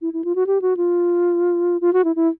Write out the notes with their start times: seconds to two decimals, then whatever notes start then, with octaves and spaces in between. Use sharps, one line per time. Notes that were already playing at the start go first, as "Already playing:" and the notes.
0.02 E4
0.13 E4
0.25 F4
0.35 F#4
0.47 G4
0.62 F#4
0.77 F4
1.81 F4
1.93 F#4
2.05 E4
2.16 E4